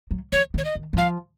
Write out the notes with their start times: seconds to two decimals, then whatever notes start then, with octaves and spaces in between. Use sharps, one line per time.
0.11 F#3
0.32 F3 C#5
0.54 D#3
0.58 C#5
0.65 D#5
0.75 D#3
0.93 F#3
0.97 F3 F5